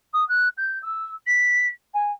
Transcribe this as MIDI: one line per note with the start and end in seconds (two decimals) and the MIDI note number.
0.13 0.26 87
0.28 0.48 90
0.57 0.78 91
0.82 1.12 88
1.26 1.69 95
1.93 2.11 80